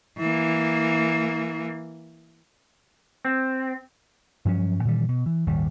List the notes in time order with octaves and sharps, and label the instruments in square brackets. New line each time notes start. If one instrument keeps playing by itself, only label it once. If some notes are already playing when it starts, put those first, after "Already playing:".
[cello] E3 A#3
[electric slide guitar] C4
[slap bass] G2 F3 F#3 C#4
A#2 D#3 E3 G3
B2
E3
D#1 G#1 D#2 G3